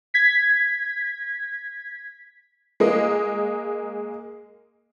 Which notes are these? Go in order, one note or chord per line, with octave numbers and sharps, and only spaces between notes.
G#6 B6
G#3 A#3 D#5